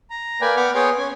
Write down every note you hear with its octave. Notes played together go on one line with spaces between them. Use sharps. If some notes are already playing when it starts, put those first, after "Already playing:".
A#5
A#3 B4 D5 G5 G#5
B3 F#5 G5 B5 D6 F6
B3 G#4 C#5 G5 C6
C#4 G#5